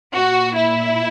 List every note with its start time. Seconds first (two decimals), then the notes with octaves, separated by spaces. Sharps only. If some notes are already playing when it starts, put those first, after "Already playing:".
0.13 A#2 F#4
0.57 E4